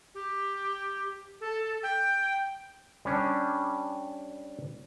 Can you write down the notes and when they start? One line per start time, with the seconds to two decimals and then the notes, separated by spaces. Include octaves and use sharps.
0.14 G4
1.41 A4
1.83 G5
3.05 G3 C#4 D4